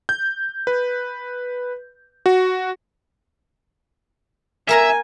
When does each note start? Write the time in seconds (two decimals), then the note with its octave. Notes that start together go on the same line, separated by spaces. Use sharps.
0.09 G6
0.67 B4
2.26 F#4
4.69 A#3 A#4 E5 G#5 A#5